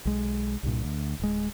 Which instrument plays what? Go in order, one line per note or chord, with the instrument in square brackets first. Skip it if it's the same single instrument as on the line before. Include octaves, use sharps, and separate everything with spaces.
[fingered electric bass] B1 G#3
C2 G2 A#2
D2
D1 G#3